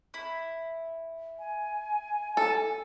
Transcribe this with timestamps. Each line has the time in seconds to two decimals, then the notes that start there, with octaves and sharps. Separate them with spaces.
0.14 E4
1.39 G#5
2.37 A4